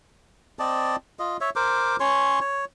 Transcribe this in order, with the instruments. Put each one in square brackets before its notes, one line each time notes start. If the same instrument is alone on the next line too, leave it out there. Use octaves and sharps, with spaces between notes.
[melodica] C4 D5 D#5 A5
F4 D#5
C#5 E5
A#4 C5 D6
C#4 C#5 C6 C#6
C#5